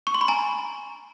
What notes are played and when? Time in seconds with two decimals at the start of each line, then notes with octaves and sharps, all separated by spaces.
0.07 C#6
0.14 C6
0.21 B5
0.28 G#5 A#5